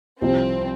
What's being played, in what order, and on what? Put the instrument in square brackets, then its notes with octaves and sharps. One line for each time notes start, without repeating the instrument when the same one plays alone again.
[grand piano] C2 C3 F3 [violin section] C4